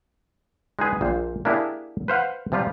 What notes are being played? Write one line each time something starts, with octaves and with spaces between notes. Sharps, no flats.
G#3 D#4 G#4 B4
A#1 A#2 C5
A#3 D4 E4 G4 G#4
B4 C5 F5 F#5
C3 F3 G3 F4 G4